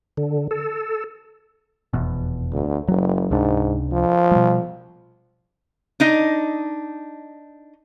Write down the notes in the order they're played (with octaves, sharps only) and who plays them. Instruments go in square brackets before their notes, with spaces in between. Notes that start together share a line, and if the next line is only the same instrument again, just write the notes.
[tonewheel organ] D3
A4
[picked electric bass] F1 E2 B2
[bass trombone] D2
[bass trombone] F#1 [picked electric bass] F#3
[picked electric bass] C#2 C3 D4 [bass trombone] G#2
[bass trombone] F3
[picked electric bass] B2 G3
[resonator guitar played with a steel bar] D4 D#4 D#5